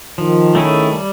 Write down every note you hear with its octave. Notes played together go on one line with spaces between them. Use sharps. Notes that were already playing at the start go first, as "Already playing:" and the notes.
D#3 F3
A3 C#4 E4 G#4
G3